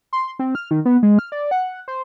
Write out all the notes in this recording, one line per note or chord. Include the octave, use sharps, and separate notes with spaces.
C6
C4
F6
D#3
B3
G#3
F6
D5
F#5
C5